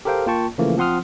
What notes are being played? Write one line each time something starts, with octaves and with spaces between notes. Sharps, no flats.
G4 A4 A#4 C5 F5 G5
A#3 F4 G5 A5 C#6
C#3 E3 F3 A3 A#3
F3 C4 F#5 C6 D#6 F6